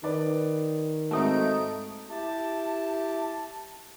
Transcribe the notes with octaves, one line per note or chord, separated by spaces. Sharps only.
D#3 B4 D5
G#2 A3 C4 D#4 F#4 D7
E4 G4 A5